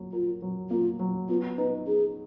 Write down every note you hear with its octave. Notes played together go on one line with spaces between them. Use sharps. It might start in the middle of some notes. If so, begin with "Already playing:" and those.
Already playing: F#3 A#3
F4 A#4
F#3
A#3 F4
F#3
B3 F4
D#4 B4
D#4 G#4